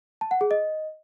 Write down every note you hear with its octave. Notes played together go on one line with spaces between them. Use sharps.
A5
F#5
G#4
D#5